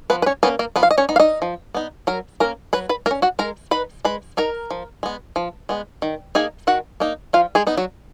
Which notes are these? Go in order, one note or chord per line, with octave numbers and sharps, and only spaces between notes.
F3 B3 B4
B4
C#4 C#5
A#3 B3 C#4 B4
A#3 A#4
F3 B3 B4
F5
D#5
C#4 C#5
B3 D#4
F5
D#4 D#5
F3
B3 D#4
F#3 A#4 A#5
A#3 C#4 A#4 A#5
F#3 B4 B5
B4 B5
A#3 A#4 A#5
C#4
F#4 F#5
G#3 A#4 A#5
D#4 B4 B5
G#3 B4 B5
D#4 A#4 A#5
F3
G#3 B3
F3
G#3 B3
D#3
A#3 D#4 G#4 G#5
D#3 F#4 F#5
A#3 D#4
F3 F4 F5
G#3 G#4
B3 D#4
F#3 F#4